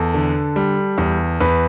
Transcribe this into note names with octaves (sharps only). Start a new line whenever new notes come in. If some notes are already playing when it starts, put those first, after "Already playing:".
Already playing: E2 A4
D3
G3
E2
E2 B4